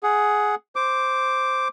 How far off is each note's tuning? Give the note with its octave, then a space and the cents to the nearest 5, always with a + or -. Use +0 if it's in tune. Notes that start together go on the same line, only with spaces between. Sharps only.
G#4 +10 F#5 +0
C5 +0 D6 +0